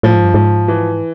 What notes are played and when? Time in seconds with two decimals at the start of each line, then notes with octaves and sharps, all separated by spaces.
0.03 A2 F3
0.15 G#2
0.24 G2
0.34 G#2 F3
0.68 E3